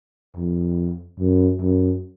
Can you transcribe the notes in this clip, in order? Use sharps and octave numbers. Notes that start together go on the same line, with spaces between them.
F2
F#2
F#2